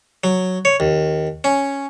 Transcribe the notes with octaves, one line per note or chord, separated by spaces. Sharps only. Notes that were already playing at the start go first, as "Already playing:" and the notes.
F#3
C#5
D#2
C#4